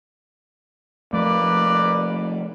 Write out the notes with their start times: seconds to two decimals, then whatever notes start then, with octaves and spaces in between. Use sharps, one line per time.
1.13 F3 A3 A#3 B4 D5